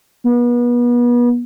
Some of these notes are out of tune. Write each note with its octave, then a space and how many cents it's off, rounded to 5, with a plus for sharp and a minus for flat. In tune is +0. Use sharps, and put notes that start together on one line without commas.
B3 -35